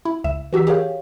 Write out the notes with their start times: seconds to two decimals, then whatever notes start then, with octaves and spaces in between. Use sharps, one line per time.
0.05 E4
0.24 C#2 E5 E7
0.53 E3 F#4 G4 E6 B6
0.67 G4 G#4 A#4 C#5 F5 G5